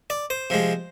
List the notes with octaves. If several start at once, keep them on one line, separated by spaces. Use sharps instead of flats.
D5
C5
C3 F3 G#3